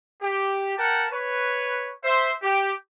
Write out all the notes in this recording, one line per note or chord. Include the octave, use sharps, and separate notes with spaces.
G4
A#4 F#5 G5 A5
B4 C#5
C5 E5
G4